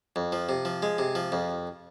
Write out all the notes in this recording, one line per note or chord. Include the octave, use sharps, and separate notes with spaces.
F2
F3
C3
F3
G#3
C3
F3
F2